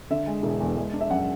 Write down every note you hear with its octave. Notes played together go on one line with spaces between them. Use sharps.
D3 E5
G#3
E1
E2
G#3
D4
E5
F#2 F#5